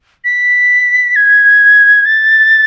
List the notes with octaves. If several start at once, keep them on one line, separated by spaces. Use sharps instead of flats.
B6
G#6
A6